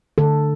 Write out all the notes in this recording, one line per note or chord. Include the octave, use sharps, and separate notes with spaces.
D3 A4